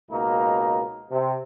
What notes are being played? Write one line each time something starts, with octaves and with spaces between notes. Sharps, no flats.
C#2 B2 A#3 D#4
C3